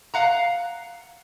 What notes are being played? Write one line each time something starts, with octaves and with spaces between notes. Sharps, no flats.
F5 F#5 A#5